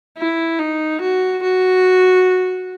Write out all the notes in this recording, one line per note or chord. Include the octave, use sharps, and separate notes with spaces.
E4
D#4
F#4
F#4